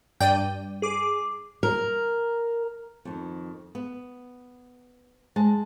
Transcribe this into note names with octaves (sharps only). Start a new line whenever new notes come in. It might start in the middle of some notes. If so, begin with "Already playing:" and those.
G2 D5 G5 D#7
G#4 D6
A#4
F2 D#3
B3
G#3 A5